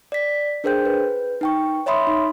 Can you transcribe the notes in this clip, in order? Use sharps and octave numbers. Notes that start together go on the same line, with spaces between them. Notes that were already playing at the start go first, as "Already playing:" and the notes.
D5 B6
D4 G#4 A#4 C5 G5 G6
B4
D#4 G5 C#6
C#5 D#5 E5 B5 C6 D#6
D#4